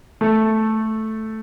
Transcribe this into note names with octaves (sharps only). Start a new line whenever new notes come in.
A3 A4